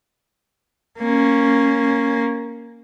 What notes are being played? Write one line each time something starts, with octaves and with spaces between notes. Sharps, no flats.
A#3 C#4